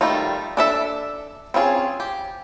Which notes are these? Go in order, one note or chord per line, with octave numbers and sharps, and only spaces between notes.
D#3 G3 A3 D#4 F4
D4 A4 E5
C4 C#4 F4 G#4
G4